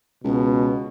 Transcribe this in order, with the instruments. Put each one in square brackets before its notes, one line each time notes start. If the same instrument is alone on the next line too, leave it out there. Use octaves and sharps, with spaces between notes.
[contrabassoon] C#2 [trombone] B2